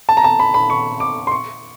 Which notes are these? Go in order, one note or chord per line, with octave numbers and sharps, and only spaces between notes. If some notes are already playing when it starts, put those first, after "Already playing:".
A5
A#5
A5
B5
B5
C#6
D6
C6
C#6